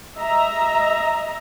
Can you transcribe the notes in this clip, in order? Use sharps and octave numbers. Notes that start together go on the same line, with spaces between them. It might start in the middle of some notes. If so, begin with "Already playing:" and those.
D#5 E5 A#5